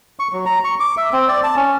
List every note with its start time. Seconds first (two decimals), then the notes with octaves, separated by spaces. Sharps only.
0.19 C#6
0.33 F#3
0.45 A#5
0.64 C#6
0.80 D6
0.97 E5
1.13 C4
1.28 D5
1.44 A5
1.56 C#4